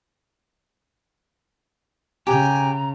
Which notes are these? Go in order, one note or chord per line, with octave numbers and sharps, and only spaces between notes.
C#3 G4 G5 G#5 A#5